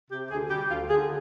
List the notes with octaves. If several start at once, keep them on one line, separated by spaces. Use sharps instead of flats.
C3 G4
D2 G#4
G3 G4
D2 F4
D3 G#4